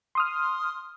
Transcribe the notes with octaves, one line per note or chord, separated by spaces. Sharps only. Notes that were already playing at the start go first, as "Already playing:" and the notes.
C6 D#6 F6